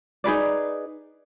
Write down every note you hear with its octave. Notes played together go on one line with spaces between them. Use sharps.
D#4 G#4 B4 D5